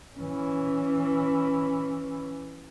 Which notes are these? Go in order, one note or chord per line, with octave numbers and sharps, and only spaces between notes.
E3 C#4